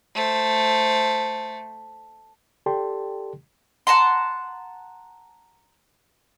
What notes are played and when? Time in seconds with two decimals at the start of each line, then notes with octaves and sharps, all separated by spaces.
0.15 A3 C5
2.66 G4 A4 D5 G5 A5 C6
3.87 F#5 A5 A#5 C6